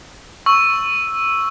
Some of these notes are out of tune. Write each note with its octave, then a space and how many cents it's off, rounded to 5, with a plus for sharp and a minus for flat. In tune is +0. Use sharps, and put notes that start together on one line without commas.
C#6 +0 E6 +0